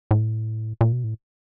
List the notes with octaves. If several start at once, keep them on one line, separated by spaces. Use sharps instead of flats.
A2
A#2
B2
A2